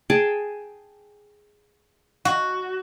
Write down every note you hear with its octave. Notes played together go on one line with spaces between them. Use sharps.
G#4 G5 A5
F#4